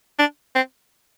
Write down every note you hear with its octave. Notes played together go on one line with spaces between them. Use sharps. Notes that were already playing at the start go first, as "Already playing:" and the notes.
D4
C4